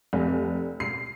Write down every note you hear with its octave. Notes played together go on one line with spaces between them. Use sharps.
F1
C7